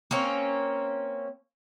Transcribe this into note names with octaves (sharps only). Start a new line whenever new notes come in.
A#3 C4 C#4